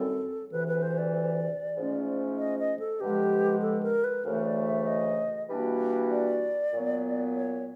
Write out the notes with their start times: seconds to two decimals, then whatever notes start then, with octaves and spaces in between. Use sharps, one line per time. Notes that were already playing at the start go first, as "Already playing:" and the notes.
Already playing: F#2 D#3 G3 C4 A4
0.51 D2 C3 E3 B4
0.68 B4
0.82 C5
0.98 D5
1.76 G#2 F3 A3 C#4
2.38 D#5
2.59 D#5
2.79 A4
3.00 G2 D3 F3 G#3 B3 G4
3.62 A4
3.83 A#4
4.04 B4
4.24 D2 C#3 E3 A3 A#4
4.45 D5
4.66 E5
4.87 D#5
5.49 E3 G3 A#3 D4 F#4
6.11 D5
6.74 A#2 F#3 B3
7.36 C#5